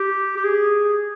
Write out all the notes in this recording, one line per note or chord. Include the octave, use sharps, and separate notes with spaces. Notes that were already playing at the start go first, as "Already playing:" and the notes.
Already playing: G4
G4
G#4